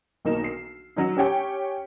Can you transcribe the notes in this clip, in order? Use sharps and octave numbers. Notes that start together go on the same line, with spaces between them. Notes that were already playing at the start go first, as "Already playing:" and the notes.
B1 A#3 D#4 E7
C7
F#3 C#4 D#4
C#4 G4 C#5 G5 G#5